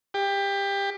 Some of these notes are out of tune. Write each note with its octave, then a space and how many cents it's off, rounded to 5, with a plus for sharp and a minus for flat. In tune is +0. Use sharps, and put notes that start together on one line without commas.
G4 +20